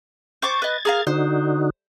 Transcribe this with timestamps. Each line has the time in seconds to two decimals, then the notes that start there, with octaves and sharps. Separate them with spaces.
0.42 C5 C#6 D6 G#6 A6
0.62 B4 D#5
0.85 G#4 A#4 F5
1.07 D3 D#4 F#4 C5